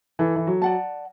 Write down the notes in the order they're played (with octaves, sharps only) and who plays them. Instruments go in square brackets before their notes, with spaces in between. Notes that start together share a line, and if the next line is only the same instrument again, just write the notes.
[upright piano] E3 [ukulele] A4
[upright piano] E3
F#3
[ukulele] D5 F#5 A5